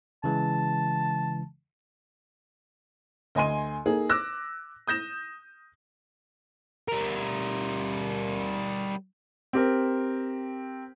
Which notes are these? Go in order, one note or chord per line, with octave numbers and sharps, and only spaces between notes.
C#3 E3 G#3 A5
D2 D#5 G#5 C6 D#7
A#3 D#4 G#4 A4
D6 E6 F#6 A#6
D#6 G6 A#6 E7
G3 A#4
C4 G4 A#4